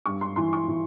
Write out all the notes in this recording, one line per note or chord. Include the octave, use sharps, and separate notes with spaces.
G2 C#6
C6
E3 C6
C#6
E3